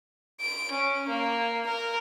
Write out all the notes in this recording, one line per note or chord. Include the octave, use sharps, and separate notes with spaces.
D7
C#4
A#3
A#4